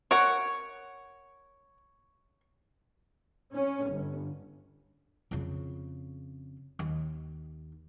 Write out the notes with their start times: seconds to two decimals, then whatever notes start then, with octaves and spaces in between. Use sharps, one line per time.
0.11 A#4 C#5 F#5
3.55 C#4
3.91 G1
5.31 F2 C#3
6.79 D#2